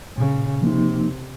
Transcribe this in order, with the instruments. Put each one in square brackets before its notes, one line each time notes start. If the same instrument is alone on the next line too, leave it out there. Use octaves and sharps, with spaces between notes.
[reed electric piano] A#2 [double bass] C#3
[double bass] C3 [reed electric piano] F3 A#3 D#4